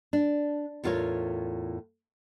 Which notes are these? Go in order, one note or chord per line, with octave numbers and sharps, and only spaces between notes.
D4
E2 A2 F4 A#4 C#5